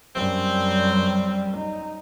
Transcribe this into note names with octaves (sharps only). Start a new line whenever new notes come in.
F#2 G3 C4
D#4